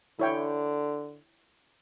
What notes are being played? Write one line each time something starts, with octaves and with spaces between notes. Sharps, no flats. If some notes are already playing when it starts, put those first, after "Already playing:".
D3 E4 C#5 G5